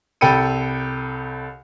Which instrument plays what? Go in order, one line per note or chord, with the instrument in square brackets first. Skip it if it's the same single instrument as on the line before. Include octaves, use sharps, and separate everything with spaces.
[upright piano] C2 A4 G5 B5 C#7 D#7